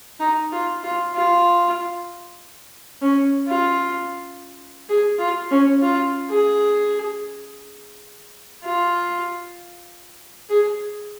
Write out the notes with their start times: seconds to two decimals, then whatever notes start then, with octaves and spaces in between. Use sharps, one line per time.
0.20 D#4
0.52 F4
0.83 F4
1.14 F4
3.01 C#4
3.48 F4
4.89 G#4
5.19 F4
5.51 C#4
5.82 F4
6.29 G#4
8.63 F4
10.50 G#4